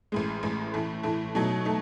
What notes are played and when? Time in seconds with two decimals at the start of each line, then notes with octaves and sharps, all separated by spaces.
0.12 A1 A2 G#3
0.43 A1 A2 G#3
0.74 A2 E3 A3
1.03 A2 E3 A3
1.35 B2 F#3 A3 D#4
1.65 A3 D#4